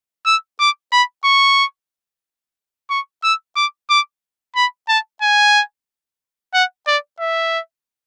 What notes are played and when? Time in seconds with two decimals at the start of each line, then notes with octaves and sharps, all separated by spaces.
0.26 E6
0.60 D6
0.93 B5
1.25 C#6
2.90 C#6
3.24 E6
3.56 D6
3.90 D6
4.56 B5
4.89 A5
5.22 G#5
6.54 F#5
6.87 D5
7.20 E5